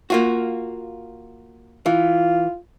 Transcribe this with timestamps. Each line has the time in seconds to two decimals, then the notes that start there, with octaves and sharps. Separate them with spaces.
0.10 A#3 F4 F#4
1.86 E3 F4